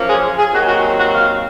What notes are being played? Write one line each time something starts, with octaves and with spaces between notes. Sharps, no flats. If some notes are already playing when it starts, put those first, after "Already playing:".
Already playing: F#2 F3 A#3 C#4
G#4
G#4
D#2 D#3 F#3 C4 F#4
F#4
F#4
F5